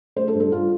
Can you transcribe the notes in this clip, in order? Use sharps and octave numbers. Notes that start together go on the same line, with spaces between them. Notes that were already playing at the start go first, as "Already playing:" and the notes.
A3 C5
A4
G2
A4
G2 F4